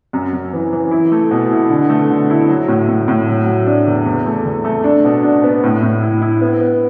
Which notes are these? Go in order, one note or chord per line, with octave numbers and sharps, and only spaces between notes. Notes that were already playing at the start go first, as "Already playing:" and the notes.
F#2
F#2
E3
E3
E4
A3
B2
E4
D3
A3
D3
E4
F#3
A2
A2
A2
F#3
F#3
D4
E2
E2
A3
E2
A3
D4
B2
D4
B3
A2
A2
E4
E4
B3
B3